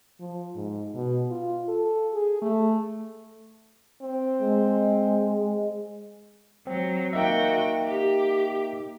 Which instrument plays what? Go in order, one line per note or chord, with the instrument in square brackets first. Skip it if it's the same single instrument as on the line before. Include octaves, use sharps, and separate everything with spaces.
[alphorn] F3
G#2
B2
F4
A4
G#4
A3
C4
[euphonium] G#3
[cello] F#3 [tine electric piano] C4
[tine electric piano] A#3 D#4 E5 [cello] F#4 G5
[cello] G4